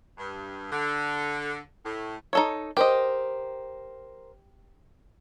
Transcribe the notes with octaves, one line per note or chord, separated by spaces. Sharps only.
G2
D3
A2
D#4 A4 C#5
G4 A#4 C5 D#5